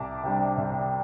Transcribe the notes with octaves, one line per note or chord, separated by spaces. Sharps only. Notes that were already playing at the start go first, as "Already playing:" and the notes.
Already playing: C2 A5 D6
C3 G3 D4
C2